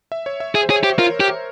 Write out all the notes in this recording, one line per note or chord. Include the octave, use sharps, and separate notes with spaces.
E5
C#5
E5
G#4 E5
C5
G#4 C#5
G4 C5
F4 A#4
G4